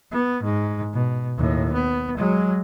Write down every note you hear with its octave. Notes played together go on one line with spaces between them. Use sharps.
B3
G#2
B2
D#2 A2
B3
F#3 G#3